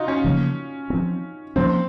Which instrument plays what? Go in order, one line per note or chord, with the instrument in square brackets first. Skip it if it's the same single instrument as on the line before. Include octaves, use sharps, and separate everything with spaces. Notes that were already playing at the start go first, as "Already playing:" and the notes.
Already playing: [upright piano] D#4 F4 F#4
C#4
[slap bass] C#3 F3 A#3
F3 C4
[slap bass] F3 A#3 C#4 [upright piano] C4